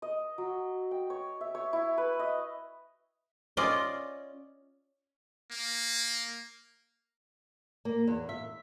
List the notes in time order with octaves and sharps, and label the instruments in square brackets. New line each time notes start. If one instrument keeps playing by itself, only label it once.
[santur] D#5
F#3
G5
C#5
E5
C#5
E4
B4
D#5
[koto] C#4 F4 D5 D#5
[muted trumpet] A#3
[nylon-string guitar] A#3
E2
E5